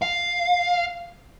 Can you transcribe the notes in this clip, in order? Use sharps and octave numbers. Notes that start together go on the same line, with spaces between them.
F5